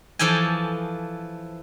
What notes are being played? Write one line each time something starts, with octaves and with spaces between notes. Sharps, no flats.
E3 F3 A4 G5 G#5